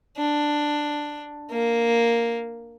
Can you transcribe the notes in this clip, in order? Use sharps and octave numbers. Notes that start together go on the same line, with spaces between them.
D4
A#3